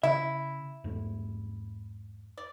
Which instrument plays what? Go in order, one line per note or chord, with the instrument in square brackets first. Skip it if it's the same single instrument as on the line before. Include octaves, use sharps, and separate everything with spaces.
[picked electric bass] C#3 [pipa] E4 [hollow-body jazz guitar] E5
[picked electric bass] E2 G#2 A3
[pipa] D5